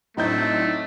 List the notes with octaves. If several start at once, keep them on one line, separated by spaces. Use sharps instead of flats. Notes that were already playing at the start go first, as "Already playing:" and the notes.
A2 F#3 A3 C4 D4 D#4 D#5 G6